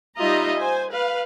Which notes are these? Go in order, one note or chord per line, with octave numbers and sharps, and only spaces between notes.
G3 D#4 F4 D#5 E5 A#5
C5 G#5
B4 F5